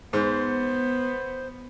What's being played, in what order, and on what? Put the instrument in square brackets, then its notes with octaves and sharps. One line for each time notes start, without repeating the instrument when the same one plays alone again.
[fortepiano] G#2 [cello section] B3 [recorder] C5